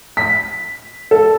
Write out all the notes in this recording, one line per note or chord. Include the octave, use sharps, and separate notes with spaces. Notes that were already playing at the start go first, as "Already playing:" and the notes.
B6
A4